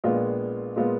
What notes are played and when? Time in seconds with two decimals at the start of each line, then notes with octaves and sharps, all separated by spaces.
0.04 A#1 A#2 G#3 B3 F4
0.76 A#2 G#3 B3 F4